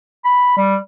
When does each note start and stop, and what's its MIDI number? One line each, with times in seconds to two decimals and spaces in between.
0.25 0.53 83
0.57 0.76 55